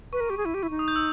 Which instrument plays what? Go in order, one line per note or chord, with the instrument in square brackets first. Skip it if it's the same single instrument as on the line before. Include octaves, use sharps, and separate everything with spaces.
[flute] B4 [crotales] C#6
[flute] A#4
[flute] G4 [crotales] C#6
[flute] G#4
E4
G4
E4
D#4
[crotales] D#6
G6
E6